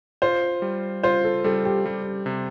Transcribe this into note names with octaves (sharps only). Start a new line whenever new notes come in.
F4 C5
G3
F4 C5
A4
G3 A4
G4
G3
C3